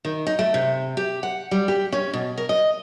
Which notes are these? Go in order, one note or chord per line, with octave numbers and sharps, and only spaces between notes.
D#3
D#4
A3
C3
G4
F#5
G3
G4
C#4
B2
A#4
D#5